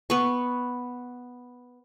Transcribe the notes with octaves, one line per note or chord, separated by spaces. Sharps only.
B3 C#6